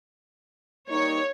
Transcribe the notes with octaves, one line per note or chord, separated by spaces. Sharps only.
G3 A#3 D#4 C#5